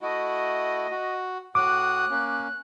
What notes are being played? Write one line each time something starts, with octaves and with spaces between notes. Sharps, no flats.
A3 E4 F#4 D#5
F#4
A2 F#4 D6 D#6 F#6
A#3 C#4